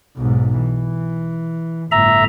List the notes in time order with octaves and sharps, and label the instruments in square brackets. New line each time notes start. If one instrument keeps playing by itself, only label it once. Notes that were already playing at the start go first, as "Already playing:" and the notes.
[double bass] B1 G#2
E3
[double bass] G1 A2 [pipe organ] E5 A#5